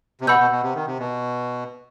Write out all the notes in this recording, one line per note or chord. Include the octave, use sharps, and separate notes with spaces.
C3
B2 F#5 B5 E6 G6
B2
B2
C3
D#3
C3
B2